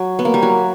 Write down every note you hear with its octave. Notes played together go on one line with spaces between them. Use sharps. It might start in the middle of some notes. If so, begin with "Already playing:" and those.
Already playing: F#3
B3
A#3
G3
F#3